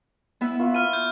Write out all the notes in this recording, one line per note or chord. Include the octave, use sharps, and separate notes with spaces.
B3 E4 E5
F4 B4 C#6
B5 F6 D#7
G6